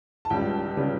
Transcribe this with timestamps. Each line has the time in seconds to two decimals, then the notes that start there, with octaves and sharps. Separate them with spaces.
0.25 A5
0.30 C#2 C#3 G3 G5
0.77 C#3 G3